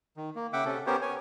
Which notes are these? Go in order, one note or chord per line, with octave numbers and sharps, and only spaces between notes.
D#3
A#3
C#3 E5 F#5 G5 D6
C3 C#4 A4
B3 C#4 G4 A#4 C5 C#5
C#5 G#5